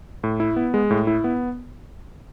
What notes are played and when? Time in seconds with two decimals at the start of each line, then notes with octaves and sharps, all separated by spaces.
0.24 A2
0.40 E4
0.56 B3
0.74 G#3
0.91 A2
1.07 E4
1.24 B3